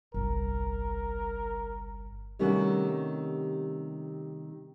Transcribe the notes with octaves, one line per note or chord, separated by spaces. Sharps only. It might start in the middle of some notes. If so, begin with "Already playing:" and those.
G1 C2 A#4
C3 D#3 G3 A3 C#4 F#4